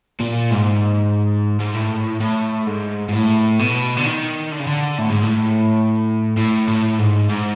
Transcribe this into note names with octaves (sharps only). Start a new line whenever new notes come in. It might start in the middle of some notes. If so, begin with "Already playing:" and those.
A#2
G#2
G#2
A2
A2
G#2
G#2
A2
B2
D3
D#3
D3
C#3
D3
A2
G#2
A2
A2
A2
G#2
G#2